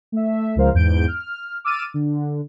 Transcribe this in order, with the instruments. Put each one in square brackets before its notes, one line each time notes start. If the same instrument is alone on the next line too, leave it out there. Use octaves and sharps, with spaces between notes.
[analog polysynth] A3 E5
C#2 F3 G#3 A#4 C5 F5
E2 G#2 G6 D7
F6
D6 E6 F6 A6 D#7
D3